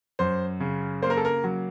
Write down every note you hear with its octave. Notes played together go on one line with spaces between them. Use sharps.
F#2 C5
C#3
A#3 C5
A#4
A4
A#4
F#3